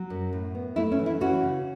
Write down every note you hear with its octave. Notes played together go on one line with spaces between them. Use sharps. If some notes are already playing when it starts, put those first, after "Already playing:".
Already playing: F#3
F#2
A2
B3
A3 E4
C#4
E3
E4
E3 C#4 F#4
C#3